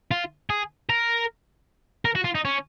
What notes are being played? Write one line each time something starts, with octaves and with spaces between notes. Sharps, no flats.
F4
G#4
A#4
A#4
F#4
F4
D#4
C#4